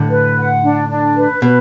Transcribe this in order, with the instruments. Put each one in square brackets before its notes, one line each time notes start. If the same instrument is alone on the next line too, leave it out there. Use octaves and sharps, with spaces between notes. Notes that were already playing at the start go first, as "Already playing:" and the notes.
Already playing: [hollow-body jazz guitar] A2 D3
[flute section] B4
F#5
D4
D4
B4
[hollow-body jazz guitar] B2 [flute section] B4